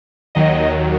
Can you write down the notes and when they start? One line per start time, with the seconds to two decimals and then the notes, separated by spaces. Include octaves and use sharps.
0.35 D#2 D#3 F#3 D#5